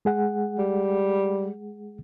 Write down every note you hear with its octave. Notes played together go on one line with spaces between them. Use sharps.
G#3 G#4 F#5
G3